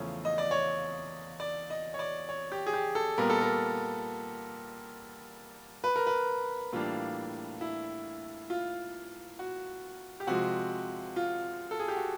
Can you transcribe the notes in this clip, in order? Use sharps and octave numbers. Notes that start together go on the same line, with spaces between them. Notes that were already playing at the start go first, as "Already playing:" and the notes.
Already playing: E2 C#3 F3 A3 C#4 C#5
D#5
D5
C#5
D5
D#5
C#5
D5
C#5
G4
G#4
G4
A4
A#2 G3 B3 A#4
A4
A#4
B4
A#4
B4
A2 E3 G3 A#3 D4 F4
E4
F4
F#4
G4
C3 F3 G#3 F#4
F4
A4
G#4
G4
F#4